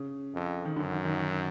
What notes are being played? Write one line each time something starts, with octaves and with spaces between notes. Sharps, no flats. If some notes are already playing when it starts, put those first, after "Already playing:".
Already playing: C#3
F2
D#3
F#2 D3
D#3
D#3
D#3